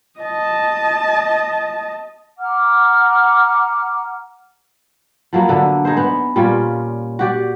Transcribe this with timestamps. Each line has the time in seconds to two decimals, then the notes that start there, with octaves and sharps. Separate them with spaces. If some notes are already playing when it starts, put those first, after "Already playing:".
0.20 D#5 A5
2.38 F#5 A#5 D6 F6
5.33 F3 F#3 A#3 B3
5.47 D3 E5
5.85 D#4 G#4 C5
5.97 B3
6.36 A#2 G3 C#4 F4
7.19 F#4 G4 D5